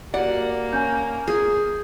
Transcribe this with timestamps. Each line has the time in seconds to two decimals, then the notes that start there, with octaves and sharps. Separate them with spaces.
0.14 A#3 F#4 G4 A#4 D5 F#5
0.73 C#4 G#5 G6
1.27 G#4